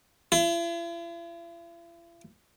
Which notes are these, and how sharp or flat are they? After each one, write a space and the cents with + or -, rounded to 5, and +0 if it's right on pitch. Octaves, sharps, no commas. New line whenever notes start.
E4 +45